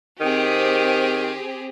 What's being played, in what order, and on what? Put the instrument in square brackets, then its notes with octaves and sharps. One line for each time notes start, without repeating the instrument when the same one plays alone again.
[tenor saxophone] D#3 [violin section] C4 G4 G#4